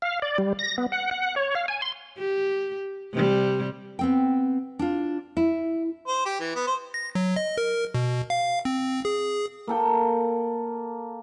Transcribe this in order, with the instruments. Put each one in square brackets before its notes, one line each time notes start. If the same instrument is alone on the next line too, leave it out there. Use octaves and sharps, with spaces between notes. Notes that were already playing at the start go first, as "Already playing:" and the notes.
[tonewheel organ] F5
D5
G3
A#6
B3
F#5
F#5
C#5
F5
G#5
C6
[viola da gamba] G4
C3 G3
[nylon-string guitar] B3 C4 G5
D4 F4
E4
[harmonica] C5
G4
E3
B3
C5
[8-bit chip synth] A#6
F#3
D#5
A#4
B2
F5
C4
G#4
[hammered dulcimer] A#3 A4 G5